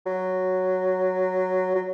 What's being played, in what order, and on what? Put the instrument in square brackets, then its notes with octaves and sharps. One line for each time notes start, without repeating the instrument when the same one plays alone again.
[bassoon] F#3
F#3